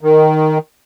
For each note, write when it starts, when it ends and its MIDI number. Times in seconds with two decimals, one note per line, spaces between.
0.01 0.58 51